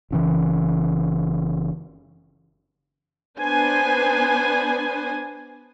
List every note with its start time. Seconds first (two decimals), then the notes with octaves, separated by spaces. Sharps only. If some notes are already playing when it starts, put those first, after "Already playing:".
0.11 F#1 C#3 E3
3.40 B3 D4 B4 C5 G#5